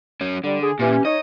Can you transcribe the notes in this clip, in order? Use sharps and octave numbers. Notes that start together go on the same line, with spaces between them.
F#3 C#4
D3 G3
G#4
A#2 E3 C#4 G4
D#4 C#5 D#5